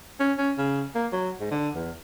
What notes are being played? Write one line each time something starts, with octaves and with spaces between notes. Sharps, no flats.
C#4
C#4
C#3
A#3
F#3
G#2
D3
E2